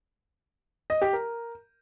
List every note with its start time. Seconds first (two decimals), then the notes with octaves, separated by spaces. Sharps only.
0.90 D#5
1.02 G4
1.13 A#4